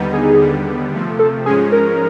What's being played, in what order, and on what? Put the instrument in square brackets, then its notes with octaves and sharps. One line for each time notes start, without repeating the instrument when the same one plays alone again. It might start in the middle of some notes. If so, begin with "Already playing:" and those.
Already playing: [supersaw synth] D#2 D3 G3 B3 D#4
[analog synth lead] G#4
[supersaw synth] D#2 D3 G3 B3
C3 F3 A3
[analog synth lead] A4
[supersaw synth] G#2 F3 G#3 C#4 [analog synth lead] G#4
[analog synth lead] A#4